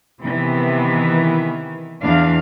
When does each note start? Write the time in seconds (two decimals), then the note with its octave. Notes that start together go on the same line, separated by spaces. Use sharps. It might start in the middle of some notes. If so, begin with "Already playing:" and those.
0.23 C3 D#3 E3 B3
2.02 E2 E3 D4 F5